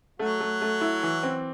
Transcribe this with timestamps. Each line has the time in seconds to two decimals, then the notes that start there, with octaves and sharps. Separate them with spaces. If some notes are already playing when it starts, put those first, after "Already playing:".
0.19 F#3 A3 F#4
0.40 A3
0.61 A3
0.81 E4
1.03 E3
1.23 C4